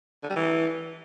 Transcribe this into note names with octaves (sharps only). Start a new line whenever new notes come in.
D3
G3
E3